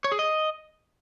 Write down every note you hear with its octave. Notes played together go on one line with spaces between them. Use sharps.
C#5
G#4
D#5